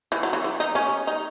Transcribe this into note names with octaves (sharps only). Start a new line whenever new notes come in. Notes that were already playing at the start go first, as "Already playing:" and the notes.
E3
F#3
E3
E3
D#4
C#4
D#4